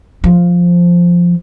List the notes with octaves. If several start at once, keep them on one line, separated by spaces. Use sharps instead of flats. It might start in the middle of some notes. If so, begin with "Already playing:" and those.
F3